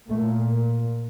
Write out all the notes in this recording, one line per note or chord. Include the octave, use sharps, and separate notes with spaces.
A#2 A3